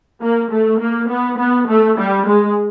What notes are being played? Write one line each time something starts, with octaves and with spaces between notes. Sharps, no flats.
A#3
A3
A#3
B3
B3
A3
G3
G#3